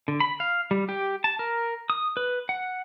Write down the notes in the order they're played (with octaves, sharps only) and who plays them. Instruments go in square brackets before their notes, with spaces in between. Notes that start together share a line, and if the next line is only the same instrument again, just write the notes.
[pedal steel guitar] D3
B5
F5
G3
G4
A5
A#4
D#6
B4
F#5